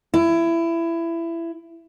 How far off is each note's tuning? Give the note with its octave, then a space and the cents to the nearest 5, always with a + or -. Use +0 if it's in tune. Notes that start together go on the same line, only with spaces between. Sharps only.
E4 +20